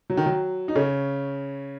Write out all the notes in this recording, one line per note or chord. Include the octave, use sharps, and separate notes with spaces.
F#3
D#3
F#3
D#4
C#3 C#4